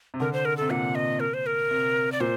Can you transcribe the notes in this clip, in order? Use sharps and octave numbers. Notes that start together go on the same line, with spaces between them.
C3
D3 A#4
C5
A#4
C3 A4
A#2 F#5
D#5
A#4
C5
A#4
C3
D5
A#2 C5